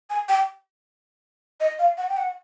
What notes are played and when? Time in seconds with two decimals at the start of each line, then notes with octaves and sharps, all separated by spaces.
0.10 G#5
0.29 G5
1.60 D#5
1.79 F5
1.97 F#5
2.09 G5
2.17 F#5